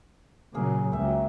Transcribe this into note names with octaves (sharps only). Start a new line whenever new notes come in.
A#2 C#3 F#3 A#3 G#4
C#2 F#3 E5 G5